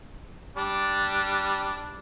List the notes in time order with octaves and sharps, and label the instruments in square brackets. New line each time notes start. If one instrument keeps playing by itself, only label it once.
[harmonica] G3 D4